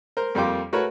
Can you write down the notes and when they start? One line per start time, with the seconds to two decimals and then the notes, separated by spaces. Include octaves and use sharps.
0.17 A#4 C5
0.35 F2 G3 A#3 F4 G5 D6
0.73 A3 F#4 A#4 B4 C#5